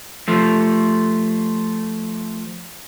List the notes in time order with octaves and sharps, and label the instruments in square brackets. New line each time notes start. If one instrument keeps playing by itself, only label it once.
[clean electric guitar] F3 A3